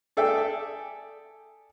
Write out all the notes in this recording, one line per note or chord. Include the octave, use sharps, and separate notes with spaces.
G#4 A4 D5 E5 G5